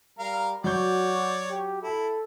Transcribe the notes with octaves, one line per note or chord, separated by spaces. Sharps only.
G3 A#4 F5
F#3 F#4 C#5 D5 G6
G4
E4 A4